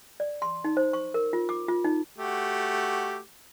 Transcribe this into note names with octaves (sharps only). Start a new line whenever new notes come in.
D5
C6
D#4
C5
C#6
A#4
F4
D6
F4
D#4
A3 F#4 G4